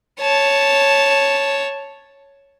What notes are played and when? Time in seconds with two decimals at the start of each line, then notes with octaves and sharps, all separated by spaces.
0.21 C#5 A5